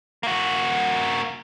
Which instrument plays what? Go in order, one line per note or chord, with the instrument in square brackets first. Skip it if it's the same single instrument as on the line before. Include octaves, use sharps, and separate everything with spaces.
[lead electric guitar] A#3 F#4